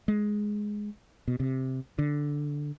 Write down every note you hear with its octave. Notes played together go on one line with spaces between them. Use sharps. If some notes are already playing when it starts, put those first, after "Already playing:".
G#3
B2
C3
D3